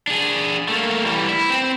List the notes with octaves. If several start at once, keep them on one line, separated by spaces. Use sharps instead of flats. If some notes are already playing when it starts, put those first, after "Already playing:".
D4 G#4
A3 A#3
E3 G3
E4
C4